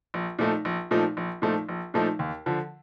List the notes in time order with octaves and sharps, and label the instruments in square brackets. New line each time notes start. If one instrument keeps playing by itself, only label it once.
[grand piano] A#1
A#2 F3 A3 D#4
A#1
A#2 F3 A3 D#4
A#1
A#2 F3 A3 D#4
A#1
A#2 F3 A3 D#4
D#2
D3 F3